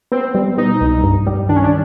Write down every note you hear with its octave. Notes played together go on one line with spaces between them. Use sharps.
B3 C4
G3
B2 D#4
C2
G2
G3
D#3 D4
C#4
D4